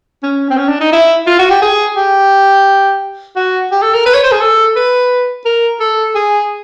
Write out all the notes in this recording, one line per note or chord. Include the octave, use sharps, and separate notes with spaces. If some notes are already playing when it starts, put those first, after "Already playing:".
C#4
C4
C#4
D4
D#4
E4
F4
F#4
G4
G#4
G4
F#4
G4
A4
A#4
B4
C#5
C5
G#4
A4
B4
A#4
A4
G#4